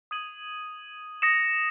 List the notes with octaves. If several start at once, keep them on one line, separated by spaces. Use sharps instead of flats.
D#6 G#6 D#7 F#7
D#6 A#6 C#7 E7